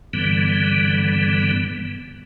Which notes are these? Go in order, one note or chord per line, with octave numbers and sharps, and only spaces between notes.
G2 D3 E3 G3 B3